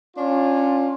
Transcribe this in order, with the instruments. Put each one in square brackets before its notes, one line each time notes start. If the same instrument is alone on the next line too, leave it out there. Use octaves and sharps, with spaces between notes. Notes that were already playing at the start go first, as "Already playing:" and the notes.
[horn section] C#4 D4 F4